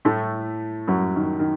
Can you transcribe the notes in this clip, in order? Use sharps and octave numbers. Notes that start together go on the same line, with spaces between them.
A2 A3
F#2 F#3
D#3
D#3